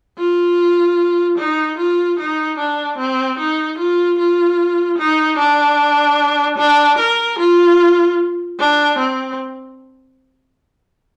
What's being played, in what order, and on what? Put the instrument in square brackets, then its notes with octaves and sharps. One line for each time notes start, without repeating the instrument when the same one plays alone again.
[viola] F4
D#4
F4
D#4
D4
C4
D#4
F4
F4
D#4
D4
D4
A#4
F4
D4
C4